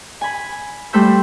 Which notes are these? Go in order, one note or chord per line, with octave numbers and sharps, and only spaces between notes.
G#5 B5
G3 A3 C5 B5 E6 G6